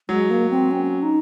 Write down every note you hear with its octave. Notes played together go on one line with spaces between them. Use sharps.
F#3 G#3
A#3
C4
C#4
D#4